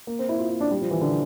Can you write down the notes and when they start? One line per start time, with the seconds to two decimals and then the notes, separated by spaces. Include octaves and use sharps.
0.07 A#3
0.19 C4
0.29 E4
0.39 F4
0.50 E4
0.61 D4
0.71 G3
0.81 F3
0.91 E3
1.01 D3